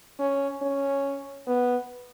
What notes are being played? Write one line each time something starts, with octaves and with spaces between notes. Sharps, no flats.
C#4
C#4
B3